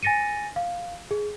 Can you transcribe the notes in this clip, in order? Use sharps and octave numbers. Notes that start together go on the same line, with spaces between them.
G#5 A6 A#6 C#7 D#7
F5
G#4